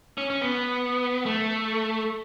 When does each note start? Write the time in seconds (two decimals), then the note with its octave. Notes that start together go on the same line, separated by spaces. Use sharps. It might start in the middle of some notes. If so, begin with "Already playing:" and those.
0.18 C#4
0.30 C#4
0.41 B3
1.26 A3